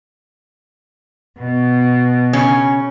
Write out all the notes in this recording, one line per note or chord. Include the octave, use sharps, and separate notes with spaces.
B2
C#3 C#4